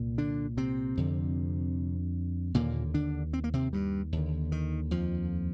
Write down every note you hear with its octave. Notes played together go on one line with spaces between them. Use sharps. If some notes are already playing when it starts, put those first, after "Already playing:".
Already playing: C2 A#2
D3 D4
C3 C4
F2 D3
D#2 A#2 D3 A#3
D3 D4
C4
A#3
C3 C4
G2 G3
D#2 D3
D#3
F2 F3